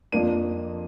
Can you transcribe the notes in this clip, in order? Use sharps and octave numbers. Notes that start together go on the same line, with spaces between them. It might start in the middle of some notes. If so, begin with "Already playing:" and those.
F2 F3 A#3 D4 D#7